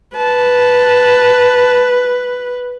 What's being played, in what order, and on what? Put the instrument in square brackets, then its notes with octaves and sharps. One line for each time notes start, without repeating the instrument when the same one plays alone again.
[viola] B4 [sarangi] A5